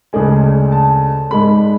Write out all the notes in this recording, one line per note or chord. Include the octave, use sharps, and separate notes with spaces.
D2 C#3 G#3 D4 G#5
A5
G#2 G#3 D4 B5